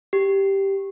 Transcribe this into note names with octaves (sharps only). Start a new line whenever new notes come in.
G4